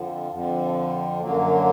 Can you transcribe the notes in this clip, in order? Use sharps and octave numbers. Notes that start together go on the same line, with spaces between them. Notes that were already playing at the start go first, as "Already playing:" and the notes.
Already playing: F2 D3 F3
F2 D3 F3
F#2 D3 F#3 A#3